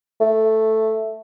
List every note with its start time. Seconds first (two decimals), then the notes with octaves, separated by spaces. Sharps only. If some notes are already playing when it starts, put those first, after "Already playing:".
0.20 A3